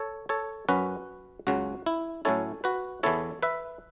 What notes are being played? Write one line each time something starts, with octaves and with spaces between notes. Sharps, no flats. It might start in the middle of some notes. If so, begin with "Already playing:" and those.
Already playing: A4 C#5
A4 C#5
F#2 F#3 C#4 F#4 B4
C#2 C#3 F#3 F#4
E4
A2 F#3 C#4 E4 A4 C#5
F#4 B4
E2 E3 B3 E4 A4 C#5
B4 E5